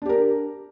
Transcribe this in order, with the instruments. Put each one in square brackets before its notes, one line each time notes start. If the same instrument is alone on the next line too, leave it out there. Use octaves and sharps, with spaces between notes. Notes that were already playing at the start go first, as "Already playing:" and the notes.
[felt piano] D4
G4
A#4